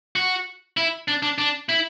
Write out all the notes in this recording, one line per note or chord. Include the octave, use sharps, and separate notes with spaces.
F#4
E4
D4
D4
D4
E4